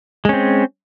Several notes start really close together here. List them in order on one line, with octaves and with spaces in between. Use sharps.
G#3 C#4 C4